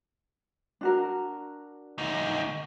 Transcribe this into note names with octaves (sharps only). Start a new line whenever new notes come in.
D4 F#4 A#4
D2 D#4